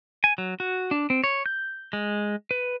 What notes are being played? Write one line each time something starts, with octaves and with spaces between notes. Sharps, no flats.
G#5
F#3
F#4
D4
C4
C#5
G6
G#3
B4